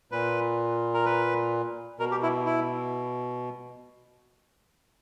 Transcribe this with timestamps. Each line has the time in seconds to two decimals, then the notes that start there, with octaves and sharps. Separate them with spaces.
0.12 A#2 B4
0.94 A#4
1.06 B4
1.99 B2 A#4
2.11 G4
2.23 E4
2.46 E4